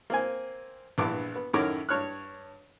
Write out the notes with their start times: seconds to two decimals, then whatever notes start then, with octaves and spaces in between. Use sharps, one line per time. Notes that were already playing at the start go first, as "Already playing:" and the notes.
0.10 A#3 C4 G#5
0.98 A#1 G2 E3 B3 D6
1.36 B3
1.53 F#2 A2 D#3 A#4 C#5 D6
1.89 G2 C#5 F6 F#6